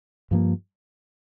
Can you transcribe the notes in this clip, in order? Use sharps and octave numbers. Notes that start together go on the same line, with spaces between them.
G2 F3 A#3